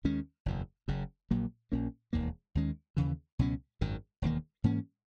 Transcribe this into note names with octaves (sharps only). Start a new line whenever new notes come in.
D#2 D#3 G#3 C#4
F#1 E2 B2
F#1 F#2 C#3
A#1 A#2 F#3 A#3
A#1 A#2 A#3 C#4
E1 D#2 D#3 A#3
D#2 D#3 G#3 C#4
D#2 C#3 E3
C#2 B2 F#3 C#4
G#1 F#2 D#3
E1 D#2 D#3 A#3
G#2 E3 A#3 C#4